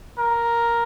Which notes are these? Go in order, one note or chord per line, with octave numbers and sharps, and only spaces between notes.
A#4